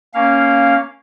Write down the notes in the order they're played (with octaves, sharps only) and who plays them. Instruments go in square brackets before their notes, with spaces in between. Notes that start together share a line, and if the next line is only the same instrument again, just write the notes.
[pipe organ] A#3 C#4 F5